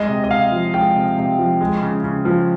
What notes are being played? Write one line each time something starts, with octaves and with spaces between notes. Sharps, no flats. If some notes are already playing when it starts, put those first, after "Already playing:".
Already playing: G#3 D#5
C3
D#5
C3 F5
F3
G#3 G5
C3
C3
F3
G#3
C#3
C#3
F3